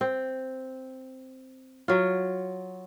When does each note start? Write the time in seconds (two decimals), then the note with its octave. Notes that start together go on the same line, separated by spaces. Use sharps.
0.01 C4
1.88 F#3 F4